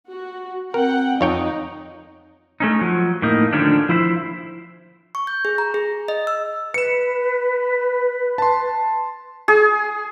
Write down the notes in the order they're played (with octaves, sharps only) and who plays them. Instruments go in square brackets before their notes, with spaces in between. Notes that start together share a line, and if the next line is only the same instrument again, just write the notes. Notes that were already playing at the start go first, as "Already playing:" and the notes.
[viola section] F#4
[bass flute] C4 [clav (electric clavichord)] A#4 [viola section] F#5 G5
[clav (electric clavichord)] F2 C#5 G5 [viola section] D#4
[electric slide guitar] A3 C#4 D#4
F3 F#3
A2 A#3 D#4
D3 D#3 F3 A3 C#4 D4
F3 E4 C5 E5
[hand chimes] C#6
G6
G#4
A#5
G#4
D#5
E6
[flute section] B4 [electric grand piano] C#7 E7
[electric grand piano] A5 C6
[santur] G#4